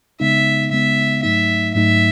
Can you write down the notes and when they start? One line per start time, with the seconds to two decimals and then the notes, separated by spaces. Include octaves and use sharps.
0.20 C#3 G#3 B3 D#4 E5
0.71 C#3 G#3 B3 D#4 E5
1.23 G#2 F#3 A3 D#4 E5
1.74 G#2 F#3 A3 D#4 E5